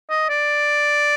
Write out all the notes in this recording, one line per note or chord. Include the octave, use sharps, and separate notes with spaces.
D#5
D5